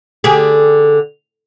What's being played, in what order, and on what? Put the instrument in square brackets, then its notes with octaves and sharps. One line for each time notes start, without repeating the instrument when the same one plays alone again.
[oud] D3 G4 G#4